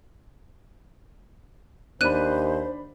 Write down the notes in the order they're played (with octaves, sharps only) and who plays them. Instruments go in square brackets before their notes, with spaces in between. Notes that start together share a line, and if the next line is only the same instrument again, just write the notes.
[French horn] D#2 [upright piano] D4 B5 [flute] C5 [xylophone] F#6 D#7